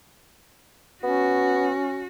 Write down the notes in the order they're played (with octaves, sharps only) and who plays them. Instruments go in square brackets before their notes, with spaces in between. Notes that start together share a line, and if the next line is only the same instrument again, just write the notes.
[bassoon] B3 [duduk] C#4 [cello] F#4